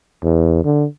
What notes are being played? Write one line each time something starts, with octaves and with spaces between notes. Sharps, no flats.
E2
D3